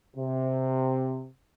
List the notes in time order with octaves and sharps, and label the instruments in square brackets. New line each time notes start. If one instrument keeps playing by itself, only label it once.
[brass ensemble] C3